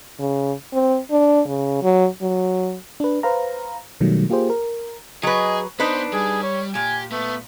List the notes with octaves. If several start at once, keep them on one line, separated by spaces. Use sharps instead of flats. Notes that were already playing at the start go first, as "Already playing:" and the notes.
C#3
C4
D4
C#3
F#3
F#3
D4 B4
B4 C5 F5 A#5
B2 D#3 F#3 G3 A3
A#3 F4 G4 G#4 C5
A#4
F#3 G#4 B4 D#5
B3 D4 D#4 B4 C5
G3 G#4
C#5
A#2 G4 G#5
A3 B3